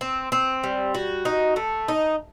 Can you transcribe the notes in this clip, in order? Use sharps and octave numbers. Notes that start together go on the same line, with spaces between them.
C4
C4
G3
F#4
D#4
A3
D#4